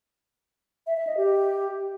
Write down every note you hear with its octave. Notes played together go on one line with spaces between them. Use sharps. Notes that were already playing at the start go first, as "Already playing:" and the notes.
E5
E5
D#5
G4